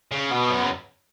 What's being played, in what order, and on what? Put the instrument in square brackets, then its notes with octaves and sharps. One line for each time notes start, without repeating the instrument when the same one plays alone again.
[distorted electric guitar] C#3
[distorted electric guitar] B2 [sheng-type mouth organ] B3
[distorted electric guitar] F#2
C#3